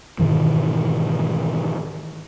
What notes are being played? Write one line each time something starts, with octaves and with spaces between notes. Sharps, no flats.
G#2 B2 D#3 E3